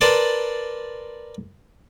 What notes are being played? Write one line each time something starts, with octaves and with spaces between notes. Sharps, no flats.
A#4 B4 D5 A5 C6